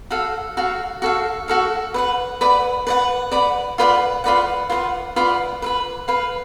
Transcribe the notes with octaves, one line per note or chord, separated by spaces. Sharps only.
F#4 A4 F5
F#4 A4 F5
F#4 A4 F5
F#4 A4 F5
B4 D5 F#5
B4 D5 F#5
B4 D5 F#5
B4 D5 F#5
F4 B4 D5 F#5
F4 B4 D5 F#5
F4 B4 D5 F#5
F4 B4 D5 F#5
B4 F5 B5
B4 F5 B5